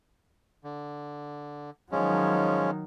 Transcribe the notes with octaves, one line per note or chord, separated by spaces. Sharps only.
D3
D#3 F3 F#3 G#3 C#4